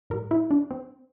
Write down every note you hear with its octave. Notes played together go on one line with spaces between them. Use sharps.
A2 G3 A#4
E4
D4
C4